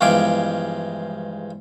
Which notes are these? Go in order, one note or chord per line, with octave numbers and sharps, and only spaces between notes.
E2 G2 F3 G#3 F5 D6